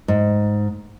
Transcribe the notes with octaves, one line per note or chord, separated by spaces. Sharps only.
G#2